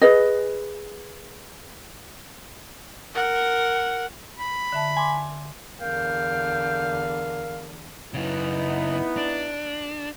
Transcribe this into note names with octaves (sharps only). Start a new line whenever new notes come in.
G#4 B4 D#5
A#4 F#5
B5
D3 E5 A5
G#5 C6 D6
E2 D3 A#4 F5 G5
F#2 C#3 B3 D#4 E4
D4